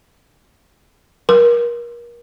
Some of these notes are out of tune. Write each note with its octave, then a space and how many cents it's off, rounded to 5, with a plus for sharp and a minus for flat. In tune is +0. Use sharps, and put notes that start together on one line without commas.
A#4 +35